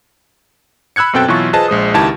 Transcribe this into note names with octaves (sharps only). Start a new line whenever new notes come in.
B5 E6 F#6 G#6 C#7
F#2 B2 C4 A4 G5 A6
B2 E3 F#3 F4 E5 C#6
F4 G#4 B4 C5 D#5 A5
A#1 G#3 C5 D#6
C#2 D#3 E4 G4 A5 G#6